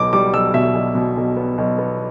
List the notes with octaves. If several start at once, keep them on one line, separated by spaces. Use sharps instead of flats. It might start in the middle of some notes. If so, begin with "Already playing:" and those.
Already playing: B1 B2 B3 D6
G3 D6
B1 E6
B2 E5
B1
B2
B1
B3
B1
B3